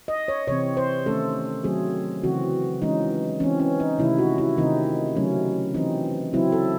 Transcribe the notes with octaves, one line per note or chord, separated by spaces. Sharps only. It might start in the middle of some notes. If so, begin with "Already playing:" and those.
D#5
C#5
C3 E3 C4 C#5
C5
D#3 A3 C#4 A4
D#3 F#3 A3 C4 G#4
C#3 E3 C4 F#4
E3 G#3 C#4 D#4
E3 C4 C#4
C#4
D#4
C3 D#3 A3 E4
F#4
E4
C3 D#3 A3 C4 D#4
C#3 F#3 A3 C#4
E3 C4 D#4
C#3 F#3 C4 E4
A4